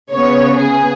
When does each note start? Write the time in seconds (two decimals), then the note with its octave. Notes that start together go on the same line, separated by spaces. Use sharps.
0.11 C#3 B3 C#5
0.58 G#4